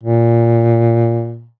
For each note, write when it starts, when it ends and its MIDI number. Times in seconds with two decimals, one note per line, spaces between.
0.03 1.48 46